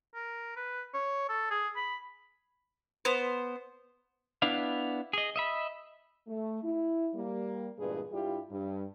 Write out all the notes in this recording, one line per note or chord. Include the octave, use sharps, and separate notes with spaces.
A#4
B4
C#5
A4
G#4
B5
B3 C5
B3 D4 E4 F5
G#4 D#5
D#5 E5 B5
A3
E4
G3 A#3
E2 G2 A#2 G#3 G#4 B4
G2 G3 E4 F4 G4
G2